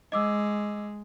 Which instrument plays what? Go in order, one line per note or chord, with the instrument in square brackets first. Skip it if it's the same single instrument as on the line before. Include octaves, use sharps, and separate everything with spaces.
[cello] G#3 [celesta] D#5 D6 E6